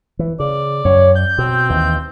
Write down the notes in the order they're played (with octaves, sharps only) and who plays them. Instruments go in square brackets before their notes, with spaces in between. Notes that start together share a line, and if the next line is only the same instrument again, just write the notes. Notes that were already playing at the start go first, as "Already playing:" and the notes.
[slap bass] E3
[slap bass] C#3 [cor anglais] D5
[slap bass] F#2 [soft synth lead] C#5
[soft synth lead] G6
[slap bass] B2 [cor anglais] C4
[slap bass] D#2 E3